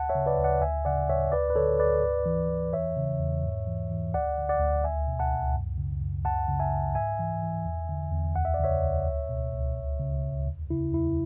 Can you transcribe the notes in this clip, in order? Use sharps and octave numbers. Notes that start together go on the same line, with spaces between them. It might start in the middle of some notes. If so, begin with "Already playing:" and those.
Already playing: D2 F#5 A5
C#5 E5
C#3
B4 D5
D2
D5 F#5
D2 E5 G#5
C#3 D5 F#5
D2 C#5 E5
D2 B4 D5
B4
D3 A4 C#5
D2 B4 D5
G#2
E3
E3
E2 C#5 E5
C#3
E2
G#2
E3
E3
D2 D5 F#5
D3
D5 F#5
D2
C#2 E5 G#5
B2
F#5 A5
C#2
F#2
C#3
F#2
C#2 F#5 A5
C#3
E5 G#5
C#2
G#2 E5 G#5
E3
E3
E2
D3
E2
D2 F#5
E5
D5
C#3 C#5 E5
D2
C#2
B2
C#2
D2
C#3
D2
E2
C#3 E4
E2 E4